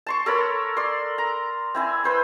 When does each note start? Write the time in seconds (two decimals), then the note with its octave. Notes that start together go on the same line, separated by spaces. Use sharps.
0.06 A5 C6 C#6
0.26 A4 A#4 C#5 B5
0.77 D5 C6
1.18 A#5
1.74 C4 E4 G#5
2.04 B4 C5 B5